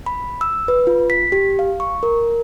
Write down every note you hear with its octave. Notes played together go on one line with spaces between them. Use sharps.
B5
E6
B4
F4
B6
G4
F5
C#6
A#4